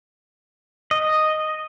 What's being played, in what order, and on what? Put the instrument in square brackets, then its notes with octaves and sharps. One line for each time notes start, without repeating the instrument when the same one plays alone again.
[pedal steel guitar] D#5